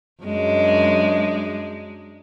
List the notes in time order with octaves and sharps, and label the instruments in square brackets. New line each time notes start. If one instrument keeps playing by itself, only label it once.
[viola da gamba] F#2 G#3 D4